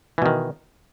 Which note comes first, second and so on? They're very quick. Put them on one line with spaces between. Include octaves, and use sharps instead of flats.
E3 B2 D#3